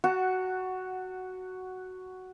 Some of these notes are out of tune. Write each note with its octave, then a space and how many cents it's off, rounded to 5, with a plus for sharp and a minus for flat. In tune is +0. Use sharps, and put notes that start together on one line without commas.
F#4 +5 F#5 +0 A5 +40